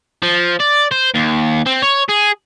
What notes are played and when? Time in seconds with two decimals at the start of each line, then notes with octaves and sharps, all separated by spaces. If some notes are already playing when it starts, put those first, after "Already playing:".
0.23 F3
0.60 D5
0.91 C5
1.14 D#2
1.66 C4
1.82 C#5
2.09 G#4